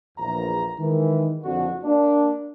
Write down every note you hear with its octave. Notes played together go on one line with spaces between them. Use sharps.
A#1 E2 A#5
D#3 E3 G#3
F#1 F2 D3 F#4
A#3 D4